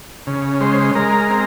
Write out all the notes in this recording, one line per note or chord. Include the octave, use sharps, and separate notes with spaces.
C#3
G#3 C5
G#3 A#4
C4